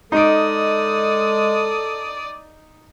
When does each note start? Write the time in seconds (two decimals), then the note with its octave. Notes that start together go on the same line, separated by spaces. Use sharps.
0.12 G#3 D#4 A4 D5 D#6 D7